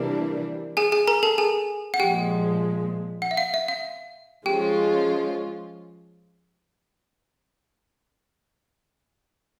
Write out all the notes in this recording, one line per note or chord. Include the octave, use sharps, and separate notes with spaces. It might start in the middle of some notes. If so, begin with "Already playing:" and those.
Already playing: C3 E3 G3 A#3 D4
G#4 G#5
G#4 G#5
A#4 A#5
A4 A5
G#4 G#5
F#5
A#2 F3 G#3 G4 G5
F#5
E5
F5
E5
F5
F3 G#3 C#4 F4 G4 G5